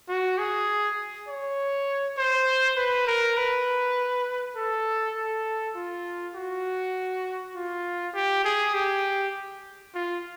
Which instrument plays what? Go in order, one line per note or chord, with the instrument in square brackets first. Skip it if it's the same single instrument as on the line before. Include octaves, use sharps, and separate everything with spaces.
[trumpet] F#4
G#4
C#5
C5
B4
A#4
B4
A4
A4
F4
F#4
F4
G4
G#4
G4
F4